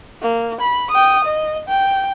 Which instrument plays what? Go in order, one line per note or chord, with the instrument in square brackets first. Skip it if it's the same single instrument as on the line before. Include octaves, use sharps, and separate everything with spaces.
[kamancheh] A#3
B5
G5 D#6
D#5
G5